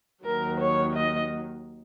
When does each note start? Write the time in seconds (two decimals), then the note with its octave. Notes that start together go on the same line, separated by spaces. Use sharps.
0.25 D#2 D#3 F#3 A#4
0.60 C#5
0.95 D#5